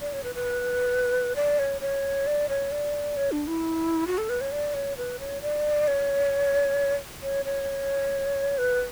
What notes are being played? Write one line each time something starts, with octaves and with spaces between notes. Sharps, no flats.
D5
C#5
B4
B4
D5
C#5
C#5
D5
C#5
D5
C#5
D4
E4
F#4
A4
B4
C#5
D5
C#5
B4
C#5
D5
C#5
C#5
C#5
B4